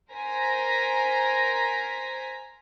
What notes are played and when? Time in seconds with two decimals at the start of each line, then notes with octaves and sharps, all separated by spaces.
0.12 A#4 C5 G#5 A#5 A#6 B6